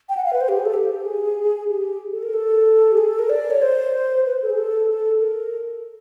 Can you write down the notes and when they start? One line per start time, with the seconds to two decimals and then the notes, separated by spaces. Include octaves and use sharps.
0.09 G5
0.17 F#5
0.25 F5
0.33 B4
0.41 C5
0.49 G4
0.57 G#4
0.65 A4
0.74 G4
1.05 G#4
1.70 G4
2.12 A4
2.23 A#4
2.34 A4
2.92 G4
2.97 G#4
3.09 A4
3.19 A#4
3.30 D5
3.50 C#5
3.62 C5
4.26 B4
4.42 A4
4.50 G#4
4.58 A4
4.90 A4
5.16 A4
5.22 A#4